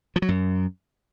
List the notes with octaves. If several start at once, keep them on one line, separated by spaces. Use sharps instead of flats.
F3
F#3
F#2